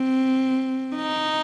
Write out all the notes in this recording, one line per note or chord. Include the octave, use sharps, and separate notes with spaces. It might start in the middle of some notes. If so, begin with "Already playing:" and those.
Already playing: C4
D#4